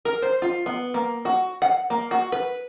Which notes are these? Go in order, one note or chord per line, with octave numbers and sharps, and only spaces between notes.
A#4
C5
F4
B3
A#3
F#4
F#5
A#3
F#4
B4